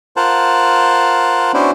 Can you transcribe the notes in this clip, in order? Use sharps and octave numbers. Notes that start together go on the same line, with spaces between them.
F4 A#4 C5 F#5 A5
B3 C#4 D4 E4 F#4 C5